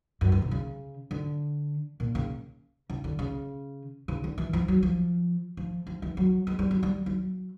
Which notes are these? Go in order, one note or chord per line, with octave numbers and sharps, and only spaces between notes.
F#2
G2
C3
C#3
D3
A#2
C#3
C#3
D3
C#3
C#3
D3
E3
F3
F#3
F3
F3
F3
E3
F#3
G#3
G3
F#3
G3
F#3